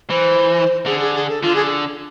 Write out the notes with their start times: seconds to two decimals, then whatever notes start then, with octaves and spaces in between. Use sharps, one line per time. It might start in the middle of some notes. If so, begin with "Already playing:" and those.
0.10 E3 C5
0.86 D3 G#4
1.00 G#4
1.15 G#4
1.29 A4
1.43 D3 F4
1.56 G#4